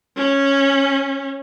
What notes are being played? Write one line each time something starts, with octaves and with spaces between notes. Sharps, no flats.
C#4